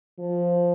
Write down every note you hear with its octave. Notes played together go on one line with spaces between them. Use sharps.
F3